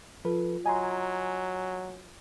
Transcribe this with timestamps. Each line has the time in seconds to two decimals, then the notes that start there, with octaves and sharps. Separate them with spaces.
0.25 F3 F4 A4 B4
0.66 F#3 D#5 G#5 A#5 C6